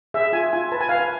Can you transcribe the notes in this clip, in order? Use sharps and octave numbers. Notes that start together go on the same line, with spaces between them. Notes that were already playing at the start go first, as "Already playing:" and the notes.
G#4 E5
F4 G#5
F4 G#5
B4 A5
G#5
B4 F5
G#5